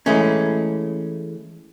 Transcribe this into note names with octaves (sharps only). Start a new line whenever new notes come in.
E3 G#3 A3 C#4